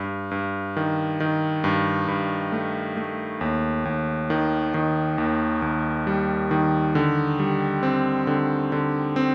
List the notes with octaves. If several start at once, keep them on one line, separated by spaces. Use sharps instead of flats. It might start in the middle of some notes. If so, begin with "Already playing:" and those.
Already playing: G2
G2
D#3
D#3
G2
G2
A3
A3
D#2
D#2
D#3
D#3
D#2
D#2
G3
D#3
D3
G3
C4
D3
D3
C4